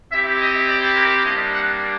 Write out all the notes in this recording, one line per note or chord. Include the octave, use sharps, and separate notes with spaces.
C4 E4 G4 E5
D#5
D5
A#4
G3 A#3 D4 D#5
F#5